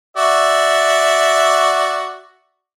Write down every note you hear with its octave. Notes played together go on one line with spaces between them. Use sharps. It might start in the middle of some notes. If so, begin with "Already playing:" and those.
F#4 D5 E5